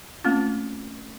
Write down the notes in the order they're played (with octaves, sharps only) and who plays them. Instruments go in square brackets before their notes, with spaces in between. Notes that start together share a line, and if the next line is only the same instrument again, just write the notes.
[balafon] A3 A#3 C4 C#4 F4